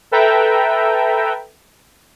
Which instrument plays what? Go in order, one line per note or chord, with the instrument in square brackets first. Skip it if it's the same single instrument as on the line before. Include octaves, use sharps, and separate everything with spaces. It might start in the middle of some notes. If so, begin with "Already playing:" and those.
[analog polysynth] A4 B4 E5 G5 A#5